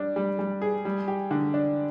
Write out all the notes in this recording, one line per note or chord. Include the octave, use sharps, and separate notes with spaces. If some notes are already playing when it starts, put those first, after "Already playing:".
Already playing: G3 D4
G3
G3
G#4
G3
G4
D3
D4